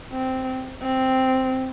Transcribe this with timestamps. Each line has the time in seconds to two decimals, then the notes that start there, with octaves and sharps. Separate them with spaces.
0.12 C4
0.82 C4